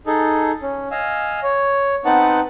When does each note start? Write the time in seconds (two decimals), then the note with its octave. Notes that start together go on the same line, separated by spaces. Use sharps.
0.07 D#4 G#4 A4
0.62 C#4
0.91 D#5 F5 G#5 E6
1.43 C#5
2.05 B3 C4 D#4 B4 F#5 A5